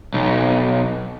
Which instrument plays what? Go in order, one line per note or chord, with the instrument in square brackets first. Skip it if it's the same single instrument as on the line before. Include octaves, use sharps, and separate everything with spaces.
[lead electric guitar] B1